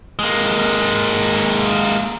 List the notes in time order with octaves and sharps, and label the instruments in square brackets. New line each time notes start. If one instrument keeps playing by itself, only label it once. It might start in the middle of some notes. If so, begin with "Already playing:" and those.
[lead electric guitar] G#3 A#3